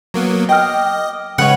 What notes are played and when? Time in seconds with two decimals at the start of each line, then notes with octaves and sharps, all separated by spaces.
0.14 F#3 A#3 B3
0.49 D#5 G5 D6 F6
1.38 C#3 G#3 B4 C#5 F#5